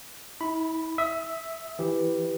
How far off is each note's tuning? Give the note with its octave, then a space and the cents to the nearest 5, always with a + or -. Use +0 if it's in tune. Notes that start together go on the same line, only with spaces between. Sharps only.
E4 -40 B5 +0
E5 +0 D#6 +35
E3 +0 G4 +0